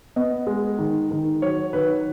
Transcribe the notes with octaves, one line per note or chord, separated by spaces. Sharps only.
B3 D#5
G#3
D#3
D#3
F#3 C#5
D#3 B4